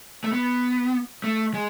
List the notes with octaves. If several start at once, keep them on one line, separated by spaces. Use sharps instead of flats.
A3
B3
A3
G#3